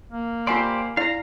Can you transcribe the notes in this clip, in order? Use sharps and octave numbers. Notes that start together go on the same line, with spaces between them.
A#3
F4 G4 C5 D5 G#5 C6
E4 D5 F5 A#5